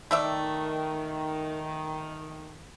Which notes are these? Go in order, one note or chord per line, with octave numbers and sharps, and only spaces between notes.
D#3 A3 D5 E5